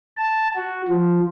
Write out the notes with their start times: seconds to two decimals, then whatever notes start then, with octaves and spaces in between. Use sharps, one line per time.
0.17 A5
0.55 F#4
0.88 F3